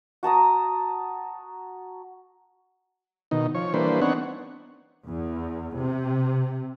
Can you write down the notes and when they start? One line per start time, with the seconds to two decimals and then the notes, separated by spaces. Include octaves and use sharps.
0.23 F#4 A5 A#5 D#6
3.31 B2 D#3 D#4
3.55 F3 C#5
3.74 E3 G3 A#3 D4 B4 C5
4.01 B3 C4 D4 D#4 C#5 F#5
5.08 E2
5.78 C3